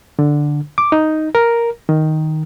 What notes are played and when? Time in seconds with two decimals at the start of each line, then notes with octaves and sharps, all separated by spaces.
0.19 D3
0.78 D6
0.92 D#4
1.35 A#4
1.89 D#3